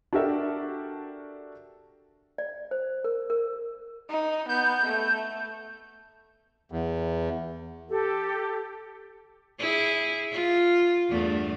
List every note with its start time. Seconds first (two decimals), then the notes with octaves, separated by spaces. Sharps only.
0.13 D4 F#4 G4 A4 A#4 E5
2.38 D5
2.71 C5
3.04 A#4
3.30 A#4
4.09 D#4
4.49 B3 G6
4.86 A3
6.72 E2
7.89 G4 A4
9.59 E4 G#4
10.32 F4
11.09 E2 G2 A3